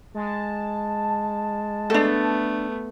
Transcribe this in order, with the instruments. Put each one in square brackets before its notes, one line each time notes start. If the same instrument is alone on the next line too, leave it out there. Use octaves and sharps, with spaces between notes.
[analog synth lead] G#3 [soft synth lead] A5
[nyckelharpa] A3 B3 [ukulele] D4 A4